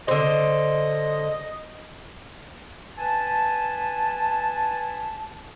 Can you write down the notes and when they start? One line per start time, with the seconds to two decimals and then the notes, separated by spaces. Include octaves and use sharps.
0.08 D3 C5 D#5
2.97 B4 G#5 A5